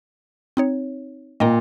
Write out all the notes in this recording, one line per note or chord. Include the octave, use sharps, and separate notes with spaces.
C4 D#4 C#5
A#2 D#5 G5 A#5